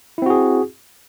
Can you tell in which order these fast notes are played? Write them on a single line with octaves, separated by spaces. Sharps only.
E4 C4 F#4 G#4